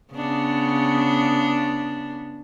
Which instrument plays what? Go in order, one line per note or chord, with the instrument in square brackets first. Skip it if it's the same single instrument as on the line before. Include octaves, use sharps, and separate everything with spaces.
[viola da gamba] C#3 B3 D4